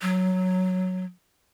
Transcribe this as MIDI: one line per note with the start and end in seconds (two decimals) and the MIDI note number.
0.02 1.05 54